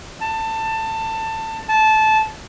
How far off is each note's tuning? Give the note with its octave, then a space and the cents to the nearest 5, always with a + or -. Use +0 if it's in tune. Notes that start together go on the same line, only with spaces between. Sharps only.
A5 +20
A5 -15